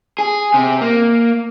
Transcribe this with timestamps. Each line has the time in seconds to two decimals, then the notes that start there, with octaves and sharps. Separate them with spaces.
0.19 G#4
0.54 C3
0.81 A#3